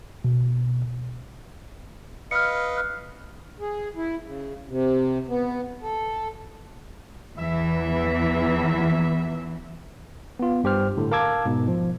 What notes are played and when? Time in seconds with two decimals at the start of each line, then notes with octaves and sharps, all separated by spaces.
0.25 B2
2.31 B4 D#5 F5 F6 C#7
2.77 F6 F#6
3.60 G#4
3.96 E4
4.24 C#3
4.68 C3
5.29 B3
5.82 A4
7.37 E2 E3 E5
10.39 B3 F4
10.64 G2 G4 C5 F6
10.97 A2 D3
11.11 A#4 F5 A5 D6 E6 G#6
11.45 G#2 B2
11.68 F3